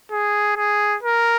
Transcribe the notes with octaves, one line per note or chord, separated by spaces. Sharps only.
G#4
G#4
A#4